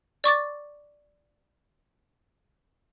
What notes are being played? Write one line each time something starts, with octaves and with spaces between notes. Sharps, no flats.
D5 C#6 D6 A6